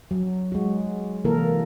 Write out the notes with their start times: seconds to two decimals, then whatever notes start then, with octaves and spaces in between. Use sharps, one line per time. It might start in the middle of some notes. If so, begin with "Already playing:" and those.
0.11 F#3
0.52 G#3 F#4
1.24 C3 E3 A#3 A4 A#4